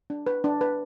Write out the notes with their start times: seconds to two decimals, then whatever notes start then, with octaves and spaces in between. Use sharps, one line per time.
0.10 D4
0.27 B4
0.44 D4
0.61 B4